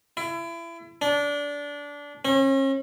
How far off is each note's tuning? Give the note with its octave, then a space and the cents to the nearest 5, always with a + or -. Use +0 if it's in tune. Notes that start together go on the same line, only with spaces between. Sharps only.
E4 +30
D4 -20
C#4 -40